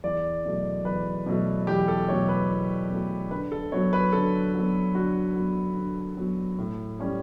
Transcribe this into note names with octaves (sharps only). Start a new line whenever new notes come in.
E2 D5
B2 F#3 A3
E2 B4
B2 F#3 A3
E2 G4
A4
B2 F#3 A3 C#5
B4
E2
B2 F#3 A3
D3 B4
A4
F#3 B3 C#5
B4
D3 A4
F#3 B3
D3 F#4
F#3 B3
D3
F#3 B3
A2
G3 C#4